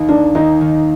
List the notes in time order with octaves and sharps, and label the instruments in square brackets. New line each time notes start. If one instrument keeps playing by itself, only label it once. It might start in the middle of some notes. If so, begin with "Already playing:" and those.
Already playing: [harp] D#2 D#3
[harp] A#3 [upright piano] D4
[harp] D#2 [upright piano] D#4
[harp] D#3